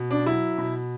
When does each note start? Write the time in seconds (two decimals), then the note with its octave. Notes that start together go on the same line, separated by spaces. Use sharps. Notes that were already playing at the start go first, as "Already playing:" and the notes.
Already playing: B2
0.11 D4
0.26 F#3 E4
0.58 B2